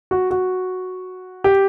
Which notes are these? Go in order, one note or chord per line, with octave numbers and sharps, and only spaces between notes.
F#4
F#4
G4